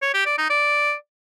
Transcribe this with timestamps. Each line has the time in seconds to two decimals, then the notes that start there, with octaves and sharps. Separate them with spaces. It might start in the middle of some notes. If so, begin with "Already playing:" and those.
0.02 C#5
0.14 G4
0.26 D5
0.38 D#4
0.50 D5